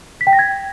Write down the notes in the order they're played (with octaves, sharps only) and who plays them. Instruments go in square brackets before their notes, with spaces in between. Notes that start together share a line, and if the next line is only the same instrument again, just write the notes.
[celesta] B6
G5
A#6
G#6